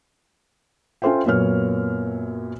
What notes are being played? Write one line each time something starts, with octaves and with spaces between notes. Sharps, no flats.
C#4 F4 A4 C5 E5 G5
F#2 A#2 A#3 B3 C#5 F6